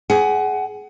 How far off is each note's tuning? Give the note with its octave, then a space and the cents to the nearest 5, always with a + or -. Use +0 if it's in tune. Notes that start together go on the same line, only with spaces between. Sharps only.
G#4 +20 F#5 +25